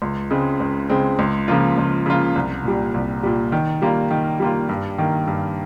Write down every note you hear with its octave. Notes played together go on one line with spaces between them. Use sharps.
C#2
C#3 G#3 C4
C#2
C#3 G#3 C4
C#2
C#3 F3 A#3 F4
C#2
C#3 F3 A#3 F4
C2
A#2 G3
C2
A#2 G3
D#3
G3 A#3 F4
D#3
G3 A#3 F4
G2
D#3 A#3
G2